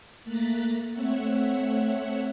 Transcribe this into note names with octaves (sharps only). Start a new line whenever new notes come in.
A3 A#3 A#5 F#6 A6 B6
A3 C4 C#5 E5 F#5